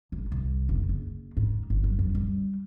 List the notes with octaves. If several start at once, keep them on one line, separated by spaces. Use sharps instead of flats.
G#1
C2
F#1
F#1
G#2
G1
F#2
F#2
G3